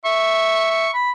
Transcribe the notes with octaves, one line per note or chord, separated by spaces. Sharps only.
E5 C#6
C#6
B5